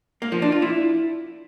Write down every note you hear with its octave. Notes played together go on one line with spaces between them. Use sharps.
A#3
F3
D4
F4
E4